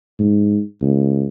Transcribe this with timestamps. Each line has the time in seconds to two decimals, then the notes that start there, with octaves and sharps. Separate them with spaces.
0.19 G#2
0.81 C#2